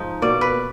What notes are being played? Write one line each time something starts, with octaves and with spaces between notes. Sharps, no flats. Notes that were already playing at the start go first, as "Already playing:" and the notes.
Already playing: G#2 F3 D#4
B2 A#3 D5
B4